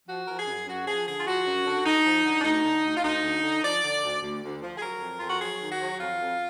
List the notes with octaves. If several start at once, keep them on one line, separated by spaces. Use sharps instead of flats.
F3 F#4
F3 A#4
G#4
F#2
F#2 F#4
F3 G#4
D3 G#4
F4
F3 F#4
F#2
D3
D3 D#4
F3
D3
D4
D2 D#4
D3
D2
F4
D2 D#4
D2
D3
F3 D5
D3
D2
D2
D2
F3
G#4
F#3 A#4
F2
F2 F4
F#4
F#3 G#4
D#3
F#4
F#3
F2 F4
F2